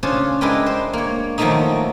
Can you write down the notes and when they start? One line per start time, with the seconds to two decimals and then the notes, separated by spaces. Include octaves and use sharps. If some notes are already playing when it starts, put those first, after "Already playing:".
0.03 C#3 C#4 D4 F4 C5
0.41 G#3 D4 E4 A#4 B4 G5
0.66 C5
0.93 A#3 C#5
1.38 D#3 F3 F#3 A3 A#3 D#4